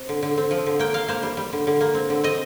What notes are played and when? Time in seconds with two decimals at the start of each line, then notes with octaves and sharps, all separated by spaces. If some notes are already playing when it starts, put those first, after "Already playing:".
Already playing: C4
0.09 D3
0.23 D3
0.37 C4
0.51 F3
0.66 D3
0.79 A#3 G5
0.94 A#3 F5
1.08 A#3 C5
1.23 G3
1.37 G3
1.53 D3
1.67 D3
1.81 A#3
1.95 C4
2.10 D3
2.23 C4 D#5